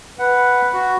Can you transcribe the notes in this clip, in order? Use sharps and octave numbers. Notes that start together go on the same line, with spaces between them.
B4 F#5
F#4